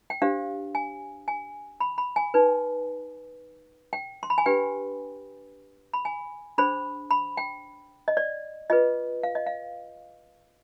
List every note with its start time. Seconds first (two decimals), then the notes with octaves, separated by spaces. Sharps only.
0.10 G5
0.22 D4 G4 C5 F5
0.75 G#5
1.28 G#5
1.80 B5
1.98 B5
2.16 G#5
2.34 D#4 B4
3.93 G5
4.23 C6
4.30 B5
4.38 G#5
4.46 D4 G4 B4 G5
5.94 B5
6.05 G#5
6.58 D4 G#4 C5 B5
7.11 B5
7.37 G5
8.08 D#5
8.17 D5
8.70 F4 G#4 B4 D#5
9.23 F5
9.35 D#5
9.47 F5